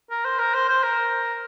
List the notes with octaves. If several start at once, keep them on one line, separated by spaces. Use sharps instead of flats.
A#4
C5
A#4
C5
C5
A#4